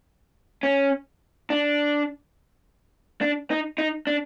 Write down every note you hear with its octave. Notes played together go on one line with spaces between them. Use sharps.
C#4
D4
D4
D#4
D#4
D4